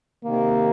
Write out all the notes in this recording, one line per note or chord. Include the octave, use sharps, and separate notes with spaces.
C3 D#3 A#3